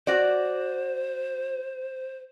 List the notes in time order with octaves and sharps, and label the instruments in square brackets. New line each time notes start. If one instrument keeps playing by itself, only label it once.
[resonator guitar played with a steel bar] F#4 D5 [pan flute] C5